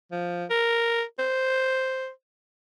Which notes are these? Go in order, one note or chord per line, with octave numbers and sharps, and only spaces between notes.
F3
A#4
C5